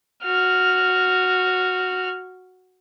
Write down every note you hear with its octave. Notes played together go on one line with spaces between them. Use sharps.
F#4 F6